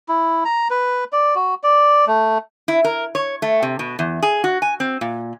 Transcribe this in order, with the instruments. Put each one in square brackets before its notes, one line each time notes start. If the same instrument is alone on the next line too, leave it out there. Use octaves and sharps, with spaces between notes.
[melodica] E4
A#5
B4
D5
F#4
D5
A3
[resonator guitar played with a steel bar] E4
A#4
C#5
A3
C3
B2
E2
G#4
F#4
G#5
C4
A#2